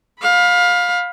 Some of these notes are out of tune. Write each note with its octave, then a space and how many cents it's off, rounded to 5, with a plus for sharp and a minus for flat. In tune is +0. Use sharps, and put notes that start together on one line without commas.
F5 +25 B5 +0